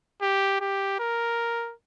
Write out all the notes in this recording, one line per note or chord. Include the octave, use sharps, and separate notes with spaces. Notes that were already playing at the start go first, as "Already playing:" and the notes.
G4
G4
A#4